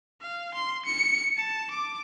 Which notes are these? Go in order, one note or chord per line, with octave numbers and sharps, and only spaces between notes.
F5
C6
C#7
A5
D6